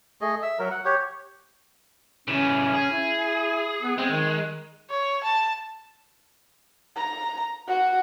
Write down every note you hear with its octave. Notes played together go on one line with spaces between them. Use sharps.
A3 G#4 D#5
E5
F#3 A#4
F#5
G4 C#5
C#3 E3 C#4
G#4
E4
B3
G#3 C4
D#3
C#5
A5
A#5
F#4